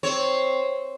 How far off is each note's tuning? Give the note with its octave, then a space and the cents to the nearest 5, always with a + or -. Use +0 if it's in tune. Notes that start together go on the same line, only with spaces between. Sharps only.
C4 +0 C#5 +0